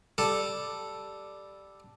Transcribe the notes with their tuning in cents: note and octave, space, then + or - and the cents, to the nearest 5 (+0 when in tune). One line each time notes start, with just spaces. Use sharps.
G3 +5 A4 +0